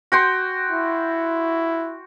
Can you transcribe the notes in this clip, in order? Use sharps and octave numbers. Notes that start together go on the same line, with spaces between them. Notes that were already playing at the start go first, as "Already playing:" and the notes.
F#4 G5 C6
E4